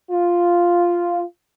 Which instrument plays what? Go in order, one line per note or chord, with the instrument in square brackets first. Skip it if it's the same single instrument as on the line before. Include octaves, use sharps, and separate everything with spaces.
[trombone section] F4